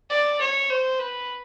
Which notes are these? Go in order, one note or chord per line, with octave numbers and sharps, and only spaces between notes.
D5
C#5
C5
B4